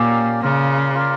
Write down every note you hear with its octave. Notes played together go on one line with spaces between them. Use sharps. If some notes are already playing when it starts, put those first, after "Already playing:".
Already playing: A#2 A#3 C#4 G4 D5
C#3 F4 A#4 D5
F4 A#4 D5